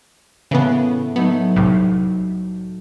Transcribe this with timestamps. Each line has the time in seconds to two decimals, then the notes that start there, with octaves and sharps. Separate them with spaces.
0.51 A2 C#3 E3 A3 B3
1.16 F#3 A3 B3 D#4
1.56 C2 A2